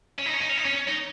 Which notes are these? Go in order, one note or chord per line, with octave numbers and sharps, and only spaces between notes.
C#4
D#4
C#4
D#4
C#4
D#4
C#4
D#4